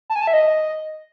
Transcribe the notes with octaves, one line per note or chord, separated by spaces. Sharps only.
A5
G#5
A5
E5
D#5